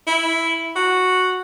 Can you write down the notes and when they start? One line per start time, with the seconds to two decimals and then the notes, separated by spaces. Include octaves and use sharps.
0.07 E4
0.76 F#4